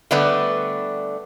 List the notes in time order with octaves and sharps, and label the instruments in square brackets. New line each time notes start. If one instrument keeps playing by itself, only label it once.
[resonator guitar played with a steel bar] D3 G3 A3 B3 D4 B4